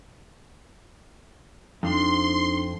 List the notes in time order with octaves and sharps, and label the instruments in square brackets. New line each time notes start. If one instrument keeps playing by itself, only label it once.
[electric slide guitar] F2 [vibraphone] D4 D#4 [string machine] C6